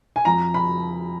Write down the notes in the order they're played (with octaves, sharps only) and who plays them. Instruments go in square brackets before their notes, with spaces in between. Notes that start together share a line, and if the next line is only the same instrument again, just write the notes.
[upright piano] G#5
F2 A#5
B5